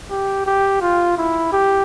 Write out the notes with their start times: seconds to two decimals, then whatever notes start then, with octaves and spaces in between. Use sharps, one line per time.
0.10 G4
0.47 G4
0.81 F4
1.18 E4
1.53 G4